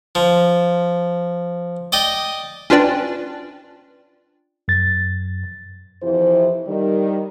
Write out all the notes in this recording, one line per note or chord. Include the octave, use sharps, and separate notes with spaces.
F3
D5 D#5 G5
C#4 D4 F4 B4 D5 G5
F#2 A6
F2 C3 E3 F3 E4 C5
D#3 G3